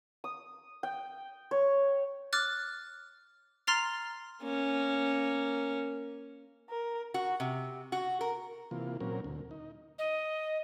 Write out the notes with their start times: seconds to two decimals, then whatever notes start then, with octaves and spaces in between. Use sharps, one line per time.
0.24 D#6
0.83 G5
1.51 C#5
2.33 D6 F6 F#6 A6
3.67 A#5 C6 F6 A6 C7 F7
4.42 A#3 C#4
6.70 A#4
7.14 F#4
7.40 C3
7.92 F#4
8.21 A#4
8.71 C3 E3 A#3 F4
9.00 A#2 F#3 C4 C#4 A#4
9.24 D2
9.51 D#4
9.98 D#5